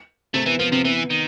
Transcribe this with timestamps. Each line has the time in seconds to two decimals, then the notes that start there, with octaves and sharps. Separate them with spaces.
0.34 C3 A3 C4
0.46 E3 B3
0.59 F3 B3
0.71 C3 F3 C4
0.84 E3 B3
1.10 D#3